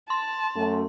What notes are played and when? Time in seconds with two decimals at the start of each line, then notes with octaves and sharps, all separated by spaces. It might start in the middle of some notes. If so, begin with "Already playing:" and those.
0.10 A5 C6
0.56 F#2 A3